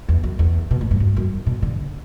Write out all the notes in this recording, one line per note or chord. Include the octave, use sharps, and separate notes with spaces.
E2
F#2
E2
B2
A2
G2
F#2
F#2
B2
D3